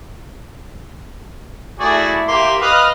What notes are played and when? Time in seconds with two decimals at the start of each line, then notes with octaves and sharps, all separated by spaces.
1.79 A3 E4 F#4 G#4 D5
2.28 A#3 G4 E5 C6 D6
2.61 B4 D#5 F5 D#6 F6